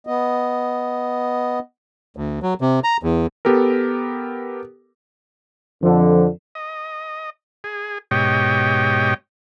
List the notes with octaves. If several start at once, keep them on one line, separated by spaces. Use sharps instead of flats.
B3 D#5
D2
F#3
C3
A#5
E2
B3 G4 A4 A#4
F2 D3 F3
D#5
G#4
G#2 B2 G4 C#5 D#5 G5